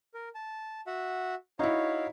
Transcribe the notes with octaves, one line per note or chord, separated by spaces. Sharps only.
A#4
A5
F#4 E5 F#5
D#4 E4 F#4 C#5 F5